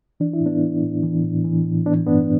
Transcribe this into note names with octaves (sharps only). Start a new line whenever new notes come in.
E3 D4
E4
A2
B3 D4
E3
A2
E3
A2
E3
A2
E3 B3 D4
G2 B3 D4